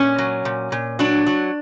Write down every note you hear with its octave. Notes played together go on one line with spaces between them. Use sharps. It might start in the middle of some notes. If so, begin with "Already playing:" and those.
Already playing: A#2 C#4
F#3
A#2
A#2
F#3 D4
F#3